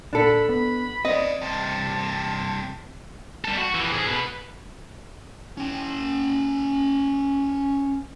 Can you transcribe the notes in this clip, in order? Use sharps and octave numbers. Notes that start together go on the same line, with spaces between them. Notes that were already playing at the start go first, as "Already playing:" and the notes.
A#2 D4 A4 B5
B3 B5
C4 B4 D5 D#5
G2 C3 A5
G3 A4
F#4
F2 E3
G#2 G#4
B2 B4
C#4 G5